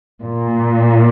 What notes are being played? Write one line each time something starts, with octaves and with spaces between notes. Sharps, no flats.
A#2